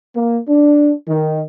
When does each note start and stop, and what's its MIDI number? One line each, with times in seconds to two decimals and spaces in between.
0.15 0.39 58
0.48 0.92 62
1.06 1.42 51